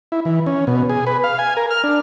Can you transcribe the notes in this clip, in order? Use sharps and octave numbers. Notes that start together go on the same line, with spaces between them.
E4
E3
C#4
B2
G#4
B4
F5
G#5
A#4
F6
D4